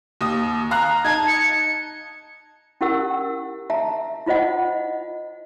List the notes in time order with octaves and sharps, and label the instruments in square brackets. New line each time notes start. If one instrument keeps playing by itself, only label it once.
[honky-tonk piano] D#2 D#6
F5 A#5 F#6
[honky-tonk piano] D#4 A5 [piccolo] G#6
[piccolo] C#7
[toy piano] C#4 E4 G4 A#4 F#5 E6
E5 A5 A#5
E4 F4 C5 D#5 F#5